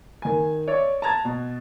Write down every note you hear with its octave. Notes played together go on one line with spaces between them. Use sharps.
D#3 G#5
C#5 D5 E5
A5 A#5 G#6 A6
B2